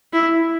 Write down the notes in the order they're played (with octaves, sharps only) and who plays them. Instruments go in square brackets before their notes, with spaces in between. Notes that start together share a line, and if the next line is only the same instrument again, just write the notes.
[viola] E4